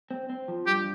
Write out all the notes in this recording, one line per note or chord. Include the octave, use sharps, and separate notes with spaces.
C4
C4
F3
G2 G4